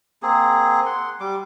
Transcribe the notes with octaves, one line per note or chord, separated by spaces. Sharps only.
A#3 C4 G#4
F#5 C6
G3 D6